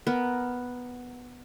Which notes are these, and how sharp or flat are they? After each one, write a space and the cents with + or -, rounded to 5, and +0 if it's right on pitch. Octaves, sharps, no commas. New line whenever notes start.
B3 +0 A#4 +0